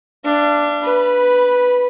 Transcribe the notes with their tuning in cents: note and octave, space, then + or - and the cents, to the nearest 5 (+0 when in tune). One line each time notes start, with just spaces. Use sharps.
D4 +0 F5 -45
B4 +0 B5 -15